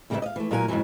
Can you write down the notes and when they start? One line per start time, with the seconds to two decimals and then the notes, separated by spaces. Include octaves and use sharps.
0.10 F2 C#3 G3 A#3 B3 E5
0.22 D#5 F5
0.36 E3 A3
0.51 A#2 F#3 A#3 A#4 B4 G#5
0.68 F2 G#2 C#3 E3 F#3